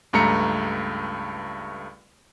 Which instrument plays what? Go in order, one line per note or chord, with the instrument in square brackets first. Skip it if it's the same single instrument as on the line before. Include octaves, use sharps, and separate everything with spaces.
[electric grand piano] C#2 G2 A3 A#5 C#7